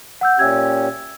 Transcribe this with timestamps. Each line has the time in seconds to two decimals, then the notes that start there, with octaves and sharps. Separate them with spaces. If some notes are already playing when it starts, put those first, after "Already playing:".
0.21 F#5 E6 G6
0.39 A#2 C#4 G4 E5 E6 G#6